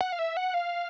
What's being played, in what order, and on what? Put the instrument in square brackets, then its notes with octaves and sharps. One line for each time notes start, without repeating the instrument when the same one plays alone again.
[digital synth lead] F#5
F5
E5
F#5
F5